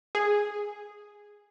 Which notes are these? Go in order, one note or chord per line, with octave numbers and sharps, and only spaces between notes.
G#4